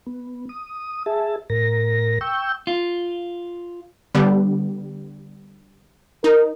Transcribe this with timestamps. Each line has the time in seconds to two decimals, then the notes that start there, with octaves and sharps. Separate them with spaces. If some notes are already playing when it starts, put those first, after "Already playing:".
0.07 B3
0.49 D#6
1.06 G#4 E5 A5
1.50 A2 A#4 A#6
2.21 G5 C#6 E6 G6
2.67 F4
4.15 D3 G3 B3
6.24 D#4 A#4